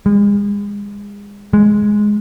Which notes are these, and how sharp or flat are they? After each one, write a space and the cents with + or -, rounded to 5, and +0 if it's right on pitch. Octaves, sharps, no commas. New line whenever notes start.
G#3 -35
G#3 +5